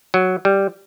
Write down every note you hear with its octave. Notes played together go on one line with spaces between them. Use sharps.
F#3
G3